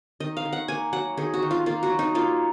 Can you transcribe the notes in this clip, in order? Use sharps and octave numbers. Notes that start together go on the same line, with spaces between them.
D#3 D#5
F5
D#3
F#5
A#3 G#5
F#3 F#5
D#3 G#4
F#4
D#3
F4
A#3 F4
F#4
F#3
D#4
A#3 F4